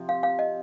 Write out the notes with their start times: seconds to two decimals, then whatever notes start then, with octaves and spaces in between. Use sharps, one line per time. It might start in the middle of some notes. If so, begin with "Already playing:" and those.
Already playing: C3 F3 C4
0.09 F5
0.23 F5
0.39 D#5